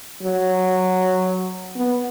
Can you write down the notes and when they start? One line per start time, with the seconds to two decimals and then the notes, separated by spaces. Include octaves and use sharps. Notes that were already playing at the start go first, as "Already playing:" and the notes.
0.23 F#3
1.76 B3